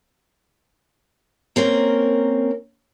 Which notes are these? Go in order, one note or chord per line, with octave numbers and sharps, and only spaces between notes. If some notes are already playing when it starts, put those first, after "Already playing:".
A#3 C4 C#4 A#4